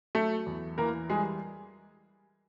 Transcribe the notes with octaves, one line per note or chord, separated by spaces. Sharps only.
F#3 A3 A4
E2
E3 A#3 A#4
G3 G#3 G#4